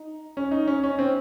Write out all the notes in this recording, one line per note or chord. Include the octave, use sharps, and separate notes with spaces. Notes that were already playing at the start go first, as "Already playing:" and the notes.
Already playing: D#4
C#4
D#4
C#4
C#4
C4